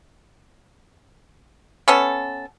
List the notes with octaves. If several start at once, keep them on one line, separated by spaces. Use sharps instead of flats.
B3 C#4 A4